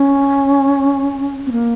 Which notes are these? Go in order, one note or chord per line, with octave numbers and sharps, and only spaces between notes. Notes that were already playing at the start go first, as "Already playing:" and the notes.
Already playing: C#4
C4
A#3